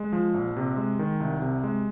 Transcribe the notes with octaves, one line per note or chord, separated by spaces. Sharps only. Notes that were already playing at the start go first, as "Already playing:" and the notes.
Already playing: G#3
F3
A#1
C3
G#3
D#3
C2
C3
G#3